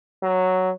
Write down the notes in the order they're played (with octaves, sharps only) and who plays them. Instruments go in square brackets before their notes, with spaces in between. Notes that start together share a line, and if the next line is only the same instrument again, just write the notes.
[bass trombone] F#3